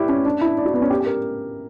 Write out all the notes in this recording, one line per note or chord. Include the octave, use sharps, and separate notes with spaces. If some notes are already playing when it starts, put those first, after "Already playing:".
Already playing: E4 G4 B4 D5
C#4
D4
E4
D5
F#4
B3
C#4
G4
G4
A#4